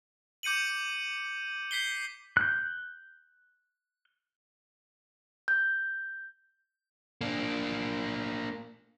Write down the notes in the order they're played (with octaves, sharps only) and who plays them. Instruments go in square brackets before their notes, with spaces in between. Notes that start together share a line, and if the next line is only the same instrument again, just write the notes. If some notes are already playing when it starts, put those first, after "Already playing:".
[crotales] D6 G6 C#7 D#7 F#7
G6 B6 C7 G7
[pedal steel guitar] F#6 G6
[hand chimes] G6
[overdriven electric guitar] A#3 D4